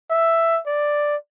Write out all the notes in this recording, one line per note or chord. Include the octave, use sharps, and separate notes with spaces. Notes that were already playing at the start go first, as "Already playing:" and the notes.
E5
D5